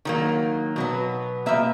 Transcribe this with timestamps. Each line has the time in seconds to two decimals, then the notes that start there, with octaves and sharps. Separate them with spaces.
0.05 D#3 F#3 A#3
0.76 B2 F#3 B3
1.46 B2 A#3 E5